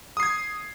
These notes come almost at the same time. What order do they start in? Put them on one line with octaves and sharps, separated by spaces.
D#6 C7 G#6